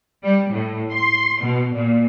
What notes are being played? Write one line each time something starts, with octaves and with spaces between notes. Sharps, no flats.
G3
A2
C6
B2
A#2